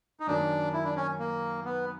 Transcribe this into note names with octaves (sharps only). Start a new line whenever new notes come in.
D#4
F#2 D#3 F#3 A#3 D4
E4
D4
C#4
A#3
B3